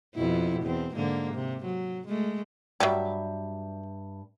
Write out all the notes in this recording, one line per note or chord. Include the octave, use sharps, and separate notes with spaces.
F2 B2 E4
E2 C4
G#2 D3 A#3
C3
F#3
G#3 A3
G2 F#3 G3 E5